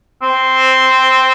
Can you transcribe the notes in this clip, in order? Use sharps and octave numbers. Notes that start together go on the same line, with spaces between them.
C4